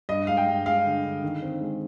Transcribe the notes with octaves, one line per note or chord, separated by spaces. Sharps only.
G2 D#5
G#3 F5
G5
G2
G#3 F5
D3
D3
D#3
C4
G#3